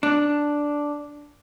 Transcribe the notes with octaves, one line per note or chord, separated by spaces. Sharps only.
D4